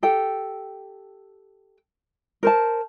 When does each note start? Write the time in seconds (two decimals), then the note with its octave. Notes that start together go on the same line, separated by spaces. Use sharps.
0.03 G4 A4 G5
2.43 A#4 C5 A5